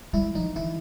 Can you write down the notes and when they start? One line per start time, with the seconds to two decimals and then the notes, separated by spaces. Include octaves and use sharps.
0.13 G3 E4
0.35 F3 D#4
0.56 E3 E4